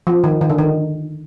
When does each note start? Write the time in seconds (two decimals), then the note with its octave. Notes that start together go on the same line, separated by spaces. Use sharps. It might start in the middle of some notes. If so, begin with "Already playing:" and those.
0.07 F3
0.24 D#3
0.41 D#3
0.50 D3
0.58 D#3